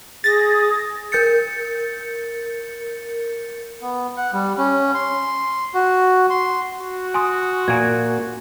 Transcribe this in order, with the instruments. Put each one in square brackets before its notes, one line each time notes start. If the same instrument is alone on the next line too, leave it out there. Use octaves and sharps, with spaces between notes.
[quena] G#4 [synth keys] A6 A#6
[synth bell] A#4 G6 A6 C#7
[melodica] B3
F#5
G3
C#4
C6
F#4
C6
[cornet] F#4
[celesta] G#5 C6 D#6
[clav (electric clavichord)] A#2 A#3 G#5 [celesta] G#6